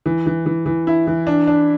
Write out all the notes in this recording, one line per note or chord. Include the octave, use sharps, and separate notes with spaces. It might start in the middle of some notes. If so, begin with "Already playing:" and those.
E3
E3
E3
E3
E4
E3
D4
D4